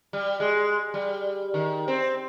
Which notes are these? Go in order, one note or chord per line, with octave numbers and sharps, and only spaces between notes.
G3
G#3
G3
D#3
C4